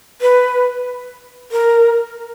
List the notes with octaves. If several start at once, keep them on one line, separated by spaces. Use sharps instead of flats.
B4
A#4